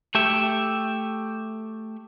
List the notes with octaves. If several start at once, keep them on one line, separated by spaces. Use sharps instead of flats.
A3 G4 E5